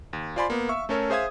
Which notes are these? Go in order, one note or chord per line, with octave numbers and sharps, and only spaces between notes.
D#2
F4 C5 D5 G#5 B5 C6
A#3 B3
E5 F5 C#6 E6
A3 C#4 A4 A#4 C#5
G#4 C5 E5 F5 D#6 G#6